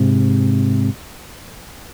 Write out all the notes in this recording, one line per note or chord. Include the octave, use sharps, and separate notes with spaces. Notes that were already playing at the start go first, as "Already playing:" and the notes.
Already playing: G#2 C3